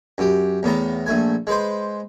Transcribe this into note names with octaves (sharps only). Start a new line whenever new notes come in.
F#2 G4
E2 A2 B3 A#5
A#1 A3 G#5
G#3 B4 C5